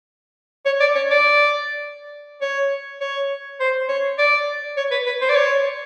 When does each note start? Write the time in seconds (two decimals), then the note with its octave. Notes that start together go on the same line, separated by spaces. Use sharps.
0.65 C#5
0.80 D5
0.95 C#5
1.10 D5
2.42 C#5
3.01 C#5
3.60 C5
3.89 C#5
4.18 D5
4.77 C#5
4.91 B4
5.06 B4
5.21 C5
5.29 D5
5.35 C#5